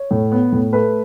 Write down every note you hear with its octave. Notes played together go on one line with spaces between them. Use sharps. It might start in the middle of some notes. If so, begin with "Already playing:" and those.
Already playing: C#5
A2
B3
A2
A3 B4